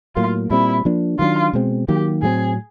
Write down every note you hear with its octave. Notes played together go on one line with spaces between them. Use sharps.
A2 F#3 A#3 F4
A#2 G3 C4 E4
F3 A#3 D4
D#3 F#3 B3 D4 F4
B2 G#3 C4
D#3 F#3 A#3 G4
A2 F#3 A3 C4 G#4